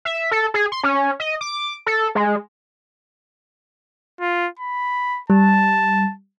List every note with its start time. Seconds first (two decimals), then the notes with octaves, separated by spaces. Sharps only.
0.05 E5
0.31 A4
0.54 G#4
0.72 C6
0.83 C#4
1.20 D#5
1.41 D6
1.86 A4
2.15 G#3
4.21 F4
4.60 B5
5.30 G3 A5